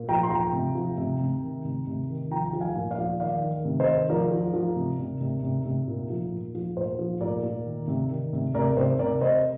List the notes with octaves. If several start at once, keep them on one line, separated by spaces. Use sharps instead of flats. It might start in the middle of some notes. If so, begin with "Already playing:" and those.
Already playing: A#2
F3 G5 A#5
C6
F3 G5 A#5
C3
F3
C3
C3
D#3
C3
C3
D#3
F3 G5 A#5
F3
F5 G#5
A#2
D5 F5
F3
D#3 D5 F5
D#3
C3
C5 D#5
D#3
F3 A#4 D5
F3
F3
C3
C3
C3
C3
C3
A#2
F3
A#2
F3
A#2 C5
F3
A#2 A#4 D5
A#2
D#3
C3
D#3
C3
C3 A#4 D5
C3 C5
C3 A#4 D5
C3 C5 D#5